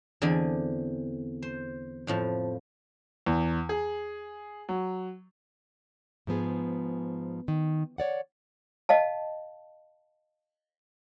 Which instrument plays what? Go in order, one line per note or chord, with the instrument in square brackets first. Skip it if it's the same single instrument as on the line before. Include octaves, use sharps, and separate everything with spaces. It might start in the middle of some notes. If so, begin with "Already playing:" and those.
[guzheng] E2 D3 C4 D5 G#5 B5
C5
F2 A2 F3
[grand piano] E2
G#4
F#3
[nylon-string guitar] G#2 F3 B3 G#4
D#3
C#5 D5 F#5
[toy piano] D#5 F5 A5